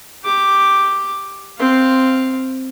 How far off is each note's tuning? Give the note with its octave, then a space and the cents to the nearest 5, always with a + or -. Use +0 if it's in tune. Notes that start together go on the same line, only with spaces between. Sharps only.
G4 +0 D6 +0
C4 +0 F5 +0